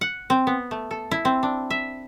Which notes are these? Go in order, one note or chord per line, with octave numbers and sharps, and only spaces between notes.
F#5
C4
B3
A3
A4
E4
C4
D4
E5